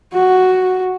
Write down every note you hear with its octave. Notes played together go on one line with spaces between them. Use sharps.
F#4